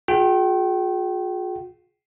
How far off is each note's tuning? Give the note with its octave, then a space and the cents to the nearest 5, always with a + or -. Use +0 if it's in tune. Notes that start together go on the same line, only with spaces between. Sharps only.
F4 +45 G#4 +10 G5 -30